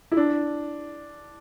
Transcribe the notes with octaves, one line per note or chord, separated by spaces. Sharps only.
E4
D4